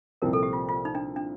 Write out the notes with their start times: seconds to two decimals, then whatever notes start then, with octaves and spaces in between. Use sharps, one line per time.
0.22 C2 A#2 F3 C4 A#4
0.33 A4
0.43 G4
0.53 F4
0.69 F4
0.85 D#4
0.95 D4
1.16 D4